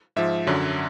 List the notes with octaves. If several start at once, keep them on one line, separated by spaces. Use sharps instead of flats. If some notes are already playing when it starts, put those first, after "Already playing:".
G#2 F3 E5
F#2 D3 F#3